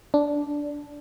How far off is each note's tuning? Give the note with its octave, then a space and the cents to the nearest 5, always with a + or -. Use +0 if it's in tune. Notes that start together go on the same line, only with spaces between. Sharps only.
D4 -10